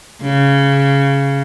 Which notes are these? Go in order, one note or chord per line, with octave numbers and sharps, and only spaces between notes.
C#3